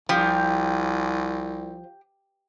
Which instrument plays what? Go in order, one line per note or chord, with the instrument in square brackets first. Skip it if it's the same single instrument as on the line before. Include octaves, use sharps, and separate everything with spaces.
[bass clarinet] C2 [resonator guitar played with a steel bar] F3 [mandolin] G4